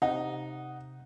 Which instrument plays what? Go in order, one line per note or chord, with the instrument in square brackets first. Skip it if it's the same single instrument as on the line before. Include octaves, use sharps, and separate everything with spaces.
[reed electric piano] C3 [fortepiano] D#4 [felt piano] F#5